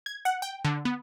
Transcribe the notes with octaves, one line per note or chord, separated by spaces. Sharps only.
G#6
F#5
G5
D3
B3